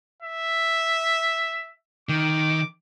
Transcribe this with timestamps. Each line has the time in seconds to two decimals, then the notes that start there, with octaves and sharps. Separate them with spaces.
0.22 E5
2.09 D#3 D6